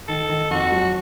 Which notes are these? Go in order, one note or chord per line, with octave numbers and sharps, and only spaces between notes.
D#3 A4
D#3
F2 F#4
F#3